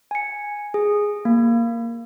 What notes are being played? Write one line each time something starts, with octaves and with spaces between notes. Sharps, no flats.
G#5 C#7
G#4
A#3